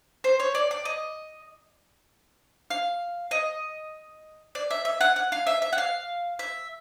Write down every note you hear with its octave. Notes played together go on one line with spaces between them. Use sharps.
C5
C#5
D5
D5
D#5
F5
D#5
D5
E5
E5
F#5
F#5
F5
E5
E5
F#5
F5
E5